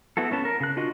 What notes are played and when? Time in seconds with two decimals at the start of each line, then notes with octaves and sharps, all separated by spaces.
0.17 B3 E4 F#4 A4
0.31 B3 C#4 A5
0.45 A#4
0.60 C#3 F#6
0.77 D4 F4 F#4 D#5